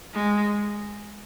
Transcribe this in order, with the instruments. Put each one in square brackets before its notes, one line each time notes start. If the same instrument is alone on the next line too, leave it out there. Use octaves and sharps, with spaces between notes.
[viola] G#3